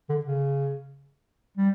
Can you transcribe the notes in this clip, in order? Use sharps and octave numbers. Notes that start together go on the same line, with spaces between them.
D3
C#3
G3